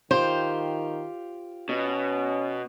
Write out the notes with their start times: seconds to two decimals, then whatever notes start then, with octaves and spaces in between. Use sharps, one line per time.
0.11 D#3 F4 G4 C5
1.69 B2 C#4